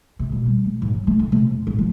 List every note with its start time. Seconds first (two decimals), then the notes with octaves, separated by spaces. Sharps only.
0.19 C3
0.32 B2
0.46 G3
0.66 B2
0.82 G#2
0.95 F#3
1.07 A3
1.19 D3
1.32 C3
1.51 F2
1.67 G#1
1.79 F3